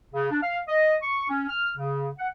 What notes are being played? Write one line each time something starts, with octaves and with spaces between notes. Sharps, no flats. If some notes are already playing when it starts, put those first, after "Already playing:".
C#3
D4
F5
D#5
C#6
C#4
F6
C#3
F#5